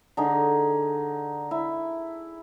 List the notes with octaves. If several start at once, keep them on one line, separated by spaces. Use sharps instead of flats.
D3 D#4 G#4
E4